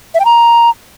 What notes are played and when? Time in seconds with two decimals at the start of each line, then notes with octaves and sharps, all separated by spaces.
0.14 E5
0.20 G5
0.25 A#5